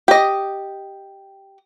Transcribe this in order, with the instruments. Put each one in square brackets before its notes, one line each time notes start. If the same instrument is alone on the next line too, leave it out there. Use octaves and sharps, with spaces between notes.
[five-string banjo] G4 D#5